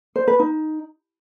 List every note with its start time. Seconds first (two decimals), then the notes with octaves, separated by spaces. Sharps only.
0.16 C5
0.28 B4
0.39 D#4